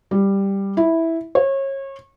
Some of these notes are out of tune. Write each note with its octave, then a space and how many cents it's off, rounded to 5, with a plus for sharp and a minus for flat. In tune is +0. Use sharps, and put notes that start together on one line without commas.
G3 +5
E4 -5
C#5 -30